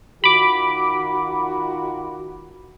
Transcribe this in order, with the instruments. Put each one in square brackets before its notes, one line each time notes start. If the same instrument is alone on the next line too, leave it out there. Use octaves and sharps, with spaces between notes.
[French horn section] D#3 F4 F#4 [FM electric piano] B5 D6